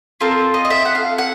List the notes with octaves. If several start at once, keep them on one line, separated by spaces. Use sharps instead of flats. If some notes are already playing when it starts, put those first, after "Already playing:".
C4 F4 A4 A#4
D#5
D#5
E5
F#5
F5
F#5